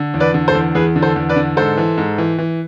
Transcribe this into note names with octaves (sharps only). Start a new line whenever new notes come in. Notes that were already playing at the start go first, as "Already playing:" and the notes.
Already playing: D3
E2
B4 D5
D3
A4 C5
E2
E2 G#4 B4
D3
A4 C5
E2
B4 D5
D3
G#2 A4 C5
E3
G#2
E3
E3